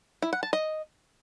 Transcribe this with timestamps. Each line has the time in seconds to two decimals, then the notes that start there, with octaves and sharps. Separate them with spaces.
0.22 E4
0.33 F#5
0.43 A5
0.53 D#5